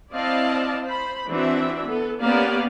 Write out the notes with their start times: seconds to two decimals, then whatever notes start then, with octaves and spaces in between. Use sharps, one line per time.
0.13 C4 E4 D5 D#5 F5 A5
0.84 C5 B5
1.30 E3 C4 D4 F#4 E5
1.86 B3 A4
2.21 A#3 B3 C#4 G4 D5 F5